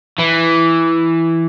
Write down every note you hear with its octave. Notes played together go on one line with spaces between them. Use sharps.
E3